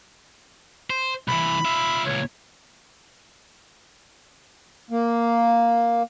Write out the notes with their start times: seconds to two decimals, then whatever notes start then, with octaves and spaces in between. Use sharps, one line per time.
0.90 C5
1.28 C2 E3 B5
1.65 F4 E5
2.06 C#2 A#2 C#5
4.91 A#3